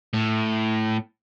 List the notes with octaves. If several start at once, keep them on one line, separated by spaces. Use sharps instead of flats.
A2